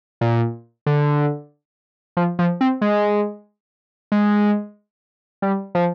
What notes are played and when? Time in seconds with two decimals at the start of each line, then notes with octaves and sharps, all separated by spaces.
0.21 A#2
0.86 D3
2.17 F3
2.39 F3
2.61 C4
2.82 G#3
4.12 G#3
5.42 G3
5.75 F3